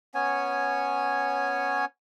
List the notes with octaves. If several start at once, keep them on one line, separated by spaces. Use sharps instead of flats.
B3 C#4 C#5 G#5